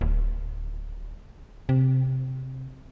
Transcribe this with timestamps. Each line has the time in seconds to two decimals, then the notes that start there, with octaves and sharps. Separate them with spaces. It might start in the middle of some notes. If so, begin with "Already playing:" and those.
0.01 D1
1.69 C3